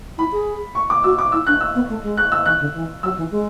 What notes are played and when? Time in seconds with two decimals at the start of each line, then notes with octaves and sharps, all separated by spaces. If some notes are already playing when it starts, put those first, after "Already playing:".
0.18 E4 B5
0.32 G#4
0.75 C#6
0.90 D6
1.04 F#4 E6
1.19 D6
1.32 E4 E6
1.47 D4 F#6
1.61 E6
1.75 B3
1.89 A3
2.03 G#3
2.17 F#6
2.32 E6
2.46 E3 F#6
2.60 D3
2.74 E3
3.03 F#3 E6
3.17 E3
3.31 G#3